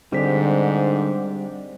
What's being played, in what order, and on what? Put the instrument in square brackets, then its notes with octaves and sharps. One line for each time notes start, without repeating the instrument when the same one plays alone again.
[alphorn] G#2 [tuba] D3 [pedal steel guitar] G3 G4 [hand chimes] C4 C5 B6